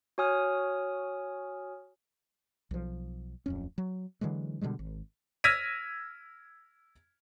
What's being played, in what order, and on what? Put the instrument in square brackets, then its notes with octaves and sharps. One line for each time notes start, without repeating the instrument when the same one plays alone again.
[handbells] F#4 C#5 G#5 D#6 F6
[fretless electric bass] B1 F3
D1 F2 C#4
F#3
D3 E3 F#3 G#3
B2 D3 G3 G#3
G#1
[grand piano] E6 F6 G#6 A#6 B6 D#7